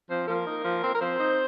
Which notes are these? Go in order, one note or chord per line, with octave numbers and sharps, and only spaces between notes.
F3 C4 C5
F3 A#3 A#4
D#4
F3
C4
A#4
F3 C4 C5
D#4